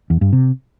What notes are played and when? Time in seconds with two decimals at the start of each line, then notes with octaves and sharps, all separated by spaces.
0.10 E2
0.21 G2
0.33 C3